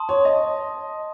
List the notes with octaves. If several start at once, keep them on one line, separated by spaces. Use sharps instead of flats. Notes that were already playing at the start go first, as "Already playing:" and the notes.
Already playing: A5 C6 D#6
C#5
D#5